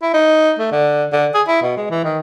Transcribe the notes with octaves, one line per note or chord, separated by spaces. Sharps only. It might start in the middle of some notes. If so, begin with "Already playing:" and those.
E4
D#4
A3
D3
D3
G#4
E4
B2
G#3
E3
D#3